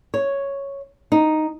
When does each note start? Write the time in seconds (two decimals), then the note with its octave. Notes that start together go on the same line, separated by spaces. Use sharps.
0.14 C#5
1.12 D#4